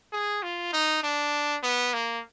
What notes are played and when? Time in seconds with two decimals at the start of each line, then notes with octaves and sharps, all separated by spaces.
0.13 G#4
0.43 F4
0.73 D#4
1.03 D4
1.63 B3
1.94 A#3